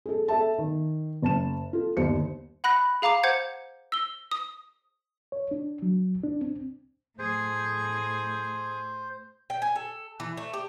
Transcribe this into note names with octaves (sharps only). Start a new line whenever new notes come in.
G#4 A4
A4 E5 A5
D#3
F#1 A5 E7
F4 A4
G1 D#2 C5 C#7
F#5 B5 F#6 A#6
G#4 F5 A#5 D6 F7
C5 F#5 G6 G#6
E6 G7
D#6
C#5
D4
F#3
D4
C4
A2 G#4 C5
G5
G#5
A4
E3
A3
G4